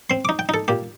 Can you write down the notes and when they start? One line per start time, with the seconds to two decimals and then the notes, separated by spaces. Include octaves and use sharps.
0.10 C4 C6
0.25 D#4 D6
0.39 G5
0.49 D#4 A4
0.68 A#2 G4